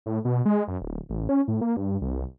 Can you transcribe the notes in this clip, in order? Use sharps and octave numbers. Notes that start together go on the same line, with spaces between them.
A2
B2
G#3
F#2
D1
A1
C#4
A2
A#3
G2
C2